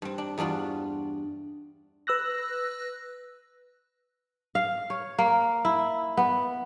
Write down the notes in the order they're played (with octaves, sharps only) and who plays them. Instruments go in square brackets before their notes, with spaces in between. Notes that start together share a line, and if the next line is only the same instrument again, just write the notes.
[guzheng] G2 C4
D4
E2 G2 D4 F4 F#4
[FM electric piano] B4 E6 F#6 A#6
[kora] F5
C#5
A#3
E4
B3